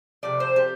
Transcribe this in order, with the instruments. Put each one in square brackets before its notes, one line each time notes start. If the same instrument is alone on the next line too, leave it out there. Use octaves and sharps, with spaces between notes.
[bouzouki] C3 F3 A3 D5
C5
G4